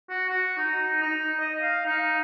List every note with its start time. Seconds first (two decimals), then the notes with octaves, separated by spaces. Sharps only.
0.10 F#4
0.29 F#4
0.58 D#4
1.02 D#4
1.40 D#5
1.61 F5
1.85 D#4